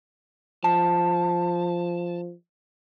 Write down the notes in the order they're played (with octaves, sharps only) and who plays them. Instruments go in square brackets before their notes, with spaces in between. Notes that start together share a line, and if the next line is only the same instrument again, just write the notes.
[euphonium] F3 [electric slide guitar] A5